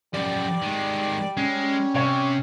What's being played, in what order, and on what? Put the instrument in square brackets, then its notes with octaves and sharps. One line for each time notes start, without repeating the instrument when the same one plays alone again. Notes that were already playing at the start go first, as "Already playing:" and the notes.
[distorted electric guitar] F#2 F3 [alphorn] G3 [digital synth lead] D5
[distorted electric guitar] D#3 G#3
[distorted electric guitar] G#3 [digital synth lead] C#4
[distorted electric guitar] C3 [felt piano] C#5